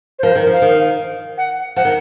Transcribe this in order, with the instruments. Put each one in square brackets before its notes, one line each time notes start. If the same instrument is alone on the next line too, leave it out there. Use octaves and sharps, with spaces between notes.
[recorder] C5
[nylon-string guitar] F3 [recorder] A#4
[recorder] C5
[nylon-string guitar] D#3
[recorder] A#4
[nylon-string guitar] F3
[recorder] F5
[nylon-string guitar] D#3
[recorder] F#5
[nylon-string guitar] F3 [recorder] F#5
[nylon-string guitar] D#3